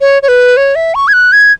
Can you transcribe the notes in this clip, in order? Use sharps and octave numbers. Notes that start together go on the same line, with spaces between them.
C#5
C#5
B4
C#5
E5
C#6
G#6
F#6
G#6